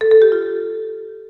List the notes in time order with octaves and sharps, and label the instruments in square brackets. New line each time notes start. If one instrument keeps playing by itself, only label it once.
[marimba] A4
A4
G4
F4